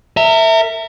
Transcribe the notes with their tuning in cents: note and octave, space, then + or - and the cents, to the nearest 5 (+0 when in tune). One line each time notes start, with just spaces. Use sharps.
A#4 -35 E5 -5